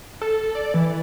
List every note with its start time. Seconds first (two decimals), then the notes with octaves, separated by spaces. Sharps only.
0.21 A4
0.55 D5
0.74 E3